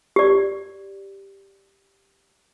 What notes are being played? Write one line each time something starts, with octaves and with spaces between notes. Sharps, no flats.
G4 D5